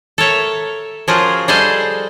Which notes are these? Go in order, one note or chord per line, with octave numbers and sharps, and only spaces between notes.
A4 A#4 C#5 E5
F3 C#4 F4 F#4 G#4 A#4
G3 G#4 A4 C5 D#5 F5